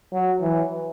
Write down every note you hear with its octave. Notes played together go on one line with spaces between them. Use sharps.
F#3
E3